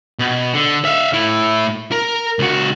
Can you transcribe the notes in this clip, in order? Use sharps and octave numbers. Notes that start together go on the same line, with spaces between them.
B2
D3
E5 F5
A2 E4
A#4
C#2 F#4